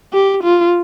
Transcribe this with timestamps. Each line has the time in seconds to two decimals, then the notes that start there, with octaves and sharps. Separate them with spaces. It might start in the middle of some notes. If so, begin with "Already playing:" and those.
0.13 G4
0.44 F4